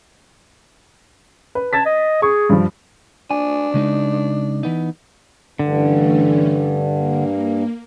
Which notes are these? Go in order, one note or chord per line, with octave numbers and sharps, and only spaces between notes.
B4
A5 G#6 A6 B6
D#5
G#4 C#6
G2 F3
D4 G#5
C#3 G#3 D#4
E3 B3 D#4
G2 D3 E3 A3 C#4
A#3